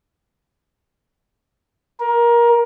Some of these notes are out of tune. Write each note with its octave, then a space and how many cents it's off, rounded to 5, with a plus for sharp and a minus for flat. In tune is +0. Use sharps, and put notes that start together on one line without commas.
A#4 +20